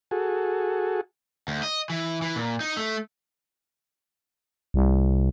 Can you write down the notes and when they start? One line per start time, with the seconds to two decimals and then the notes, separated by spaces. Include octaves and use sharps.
0.11 F#4 G#4 A4
1.48 D2
1.63 D#5
1.90 E3
2.22 E3
2.36 A#2
2.60 D#4
2.77 A3
4.74 C2